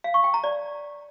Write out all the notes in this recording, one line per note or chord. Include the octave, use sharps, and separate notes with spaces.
F5
C#6
G5
A#5
D5